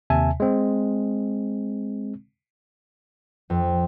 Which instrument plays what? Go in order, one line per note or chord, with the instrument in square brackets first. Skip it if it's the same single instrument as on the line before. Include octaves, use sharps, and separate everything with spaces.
[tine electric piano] D#2 C3 E5 G#5 A5
G#3 C4
[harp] F2